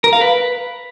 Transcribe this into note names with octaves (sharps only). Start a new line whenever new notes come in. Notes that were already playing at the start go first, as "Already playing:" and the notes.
A#4
F5
B4